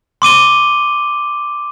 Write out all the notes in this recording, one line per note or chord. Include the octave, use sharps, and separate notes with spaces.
C6 D6 D#7 G7